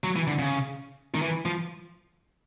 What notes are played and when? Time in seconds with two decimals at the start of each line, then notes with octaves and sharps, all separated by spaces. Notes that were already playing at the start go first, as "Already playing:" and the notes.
0.04 F#3
0.16 E3
0.27 D3
0.39 C#3
1.15 D#3
1.22 E3
1.45 F3